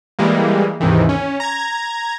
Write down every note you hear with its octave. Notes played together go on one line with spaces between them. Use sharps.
E3 G3 G#3 A#3
D#2 G#2 C3 D#3 E3
C#4
A#5 G#6